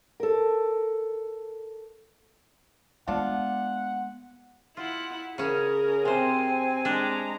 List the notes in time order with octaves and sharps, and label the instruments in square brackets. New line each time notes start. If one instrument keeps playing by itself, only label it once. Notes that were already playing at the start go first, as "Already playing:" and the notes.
[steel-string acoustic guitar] A4 A#4
[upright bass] G#3 B3 [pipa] D4 F4 [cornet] F#5
[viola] E4 F#5 [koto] F4
[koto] C#3 C#4 [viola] G#4 A#4
[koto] C3 C5 [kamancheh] C4 G#5
[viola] G#3 A#5 [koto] D4